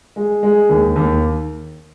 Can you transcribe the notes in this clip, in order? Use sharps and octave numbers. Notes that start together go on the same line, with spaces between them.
G#3
G#3
D#2
D#2